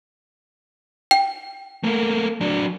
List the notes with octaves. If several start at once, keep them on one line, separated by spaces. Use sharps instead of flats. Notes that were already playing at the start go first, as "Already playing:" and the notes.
G5
A3 A#3
F#3 D4